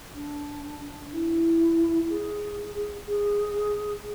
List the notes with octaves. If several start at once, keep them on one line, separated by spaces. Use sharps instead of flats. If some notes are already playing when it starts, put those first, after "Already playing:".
D4
E4
G#4
G#4